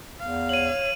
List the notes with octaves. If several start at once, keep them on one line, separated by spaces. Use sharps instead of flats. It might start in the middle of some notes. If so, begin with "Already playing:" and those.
E2 F5
C#5 D#7 F#7